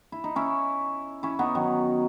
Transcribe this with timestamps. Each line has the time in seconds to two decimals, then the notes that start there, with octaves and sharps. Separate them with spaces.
0.12 E4
0.24 D#4
0.36 C#4 E4
1.23 C#4 E4
1.39 B3 D#4
1.55 D#3 F#3